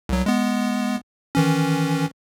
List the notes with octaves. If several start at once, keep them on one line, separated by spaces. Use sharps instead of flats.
C2 F#3
G#3 B3
D#3 E3 C#4